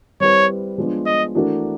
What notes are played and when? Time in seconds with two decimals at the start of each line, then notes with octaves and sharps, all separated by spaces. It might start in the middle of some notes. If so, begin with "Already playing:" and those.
0.20 G3 C4 E4 G4 B4 C#5
0.78 F3 G#3 B3 D4 F4
1.06 D#5
1.35 E3 A3 D4 F#4 A#4